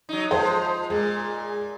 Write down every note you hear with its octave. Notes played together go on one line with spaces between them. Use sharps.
F#3 D#4
F3 G#3 C5
A#2 G#3